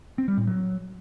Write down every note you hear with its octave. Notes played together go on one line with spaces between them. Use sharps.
C4
G3
A2
F#3